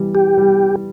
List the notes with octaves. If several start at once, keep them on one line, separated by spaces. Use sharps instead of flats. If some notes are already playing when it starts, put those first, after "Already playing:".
Already playing: E3 G3
G4
G3